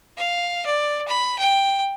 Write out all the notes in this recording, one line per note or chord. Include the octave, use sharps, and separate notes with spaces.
F5
D5
B5
G5